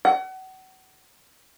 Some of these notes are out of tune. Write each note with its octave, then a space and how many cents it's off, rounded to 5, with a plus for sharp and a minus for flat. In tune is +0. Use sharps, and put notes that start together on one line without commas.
F#5 +35